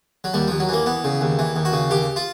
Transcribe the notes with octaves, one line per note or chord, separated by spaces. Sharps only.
F#3
D#2 G3
D#2 F3
F#3
E3 A#3
E3 B3
C#3
D#2
E3
D#2
F#4
C#3
D#2 G4
F4